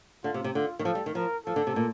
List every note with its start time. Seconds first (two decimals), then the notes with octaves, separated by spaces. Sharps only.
0.24 D3 F4
0.34 C3
0.44 C3
0.55 D3 F4
0.79 D#3
0.85 F3 A4
0.95 G3
1.06 D#3
1.15 F3 A#4
1.46 F3 A4
1.56 D3
1.67 C3
1.76 A#2